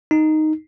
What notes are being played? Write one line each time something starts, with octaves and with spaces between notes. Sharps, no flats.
D#4